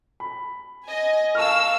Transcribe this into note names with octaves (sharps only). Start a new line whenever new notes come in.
B5
D#5 G#5
A#4 F5 A5 C#6 E6 F6